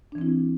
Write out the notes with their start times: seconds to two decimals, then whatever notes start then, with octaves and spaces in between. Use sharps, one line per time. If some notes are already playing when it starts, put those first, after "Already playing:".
0.12 D4
0.15 E3
0.18 C4
0.21 E4